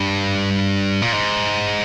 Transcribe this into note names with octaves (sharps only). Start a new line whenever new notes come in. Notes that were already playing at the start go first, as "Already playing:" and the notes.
Already playing: G2
A#2
G#2